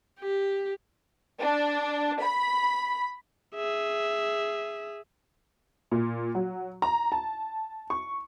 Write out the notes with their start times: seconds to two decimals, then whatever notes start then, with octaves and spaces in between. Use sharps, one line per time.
0.20 G4
1.41 D4
2.22 B5
3.55 G#4 E5
5.91 A#2
6.35 F#3
6.82 A#5
7.12 A5
7.90 C#6